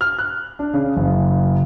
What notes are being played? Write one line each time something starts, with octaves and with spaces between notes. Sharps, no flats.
F6
F#6
D4
C#3
F#1